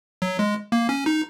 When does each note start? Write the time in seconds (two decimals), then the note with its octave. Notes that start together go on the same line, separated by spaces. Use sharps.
0.22 F#3
0.39 G#3
0.72 A#3
0.89 C#4
1.06 D#4